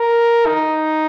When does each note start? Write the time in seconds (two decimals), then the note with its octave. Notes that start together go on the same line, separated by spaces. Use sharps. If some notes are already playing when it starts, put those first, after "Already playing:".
Already playing: A#4
0.46 D#4